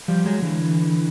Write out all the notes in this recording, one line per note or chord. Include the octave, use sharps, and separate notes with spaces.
F3 G3
F#3 G#3
D3 E3